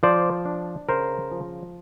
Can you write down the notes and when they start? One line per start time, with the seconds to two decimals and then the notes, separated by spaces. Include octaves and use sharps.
0.03 F3 C5 D5
0.45 D4
0.89 C#3 A#4 C5
1.32 F3